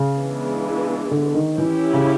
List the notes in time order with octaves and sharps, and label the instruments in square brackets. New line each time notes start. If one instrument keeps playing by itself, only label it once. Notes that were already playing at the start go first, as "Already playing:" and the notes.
Already playing: [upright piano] C#3
[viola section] E3 G#3 B3 D4
[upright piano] D3
D#3
[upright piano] E3 [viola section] C#4 E4 G4
[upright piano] C#3